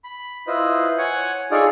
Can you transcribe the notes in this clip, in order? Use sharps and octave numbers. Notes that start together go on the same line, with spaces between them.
B5
E4 F4 B4 C5 D#5
C#5 F#5 G#5
D#4 F4 G#4 A4 C#5 D5